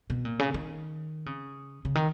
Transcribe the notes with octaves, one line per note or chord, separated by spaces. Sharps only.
B2
A#2
C#3
D#3
C#3
C#3
D#3